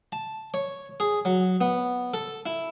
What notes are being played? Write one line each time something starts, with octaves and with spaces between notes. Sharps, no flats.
A5
C#5
G#4
F#3
B3
A4
E4